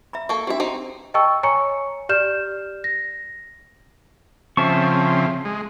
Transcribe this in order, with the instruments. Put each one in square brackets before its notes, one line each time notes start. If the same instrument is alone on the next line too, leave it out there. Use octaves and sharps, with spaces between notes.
[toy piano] E5 A#5 B5
[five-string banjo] A#3 A4 [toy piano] C#6
[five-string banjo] C4 E5 [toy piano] D4 F#4 G4
[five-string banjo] C4 D#4
[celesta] D#5 G5 A5 C#6 E6
C#5 G#5 A#5 C#6 C#7
G4 D5 F6 G6 E7
A#6
[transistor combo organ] C#3 F3 C4 [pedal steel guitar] E5 A5 C#6
[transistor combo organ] G#3